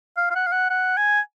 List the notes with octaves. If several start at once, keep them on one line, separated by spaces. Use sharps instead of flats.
F5
F5
F#5
F5
F#5
F#5
G#5